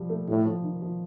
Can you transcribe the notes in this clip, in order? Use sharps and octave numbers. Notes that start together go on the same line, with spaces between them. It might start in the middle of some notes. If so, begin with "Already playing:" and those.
Already playing: F3 G3
A3
A2 G3
F3
D#3
F3